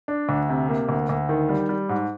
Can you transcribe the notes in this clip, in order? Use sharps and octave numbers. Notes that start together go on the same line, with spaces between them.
D4
D2
C3
A#3
D2
D2
D#3
G3
G3
G#2